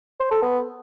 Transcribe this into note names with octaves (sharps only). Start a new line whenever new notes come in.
C5
A4
B3